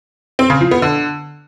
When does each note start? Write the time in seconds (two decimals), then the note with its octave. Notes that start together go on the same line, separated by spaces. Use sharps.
0.39 C4
0.50 C#3
0.61 F3
0.71 B3
0.82 D3